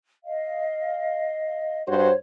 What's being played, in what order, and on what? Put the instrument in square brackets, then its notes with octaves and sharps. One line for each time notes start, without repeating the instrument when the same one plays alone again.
[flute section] D#5 F5
[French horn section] G2 F#4 C5 [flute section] C#5